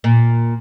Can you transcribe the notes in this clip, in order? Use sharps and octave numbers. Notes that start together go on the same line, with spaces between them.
A#2